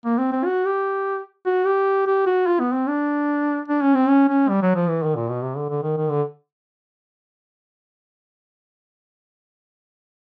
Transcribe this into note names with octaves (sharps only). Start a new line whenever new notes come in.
A#3
C4
C4
F#4
G4
F#4
G4
G4
F#4
F4
B3
C4
D4
D4
C#4
C4
C#4
C#4
G3
F#3
F3
E3
D#3
A#2
B2
C3
D3
D3
D#3
D#3
D3